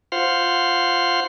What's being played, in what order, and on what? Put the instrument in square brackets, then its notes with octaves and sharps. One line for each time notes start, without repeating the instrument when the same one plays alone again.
[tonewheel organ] F4 C5 F5 F#5 C6